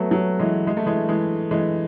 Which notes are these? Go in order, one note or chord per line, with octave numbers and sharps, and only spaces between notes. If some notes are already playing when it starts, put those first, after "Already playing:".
Already playing: F#3 A3 B3
F#3
E3 G#3
G#3
A3
E3 G#3
E3 G#3
E3 G#3